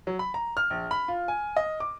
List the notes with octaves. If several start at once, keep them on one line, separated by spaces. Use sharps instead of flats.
F#3
B5
A#5
F6
A#1
B5
F4
G#5
D#5
D6